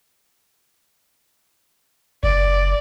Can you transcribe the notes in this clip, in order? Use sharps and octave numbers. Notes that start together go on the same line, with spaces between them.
F#1 D5